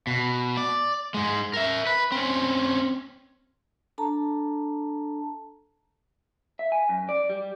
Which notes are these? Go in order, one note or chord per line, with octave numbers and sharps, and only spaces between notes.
B2
D5
G#2 G#3
A#4 E5
B4
C4 C#4
D4 A4 A5 A#5
E5
G#5
F#2
D5
G3